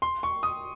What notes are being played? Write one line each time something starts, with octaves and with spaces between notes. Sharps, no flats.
C6
C#6
D#6